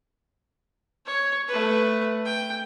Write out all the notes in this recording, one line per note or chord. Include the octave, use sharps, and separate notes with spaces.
C#5
A3 B4
G5